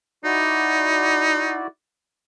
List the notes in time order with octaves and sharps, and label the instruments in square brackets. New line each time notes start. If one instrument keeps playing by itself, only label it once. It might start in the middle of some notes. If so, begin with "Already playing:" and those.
[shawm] D#4 [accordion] E4 F#4 D5